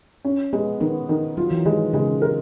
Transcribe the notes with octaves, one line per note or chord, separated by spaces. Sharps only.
C#4
G#3 B3
D#3 B3
D#3
F#3 F4
E3
D#3 G#3
C#3 G#3
A#4